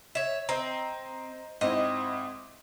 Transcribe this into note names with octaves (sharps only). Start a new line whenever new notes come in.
C#5 E5
C4 C5 D#5 A#5
G#2 C4 E4 D#5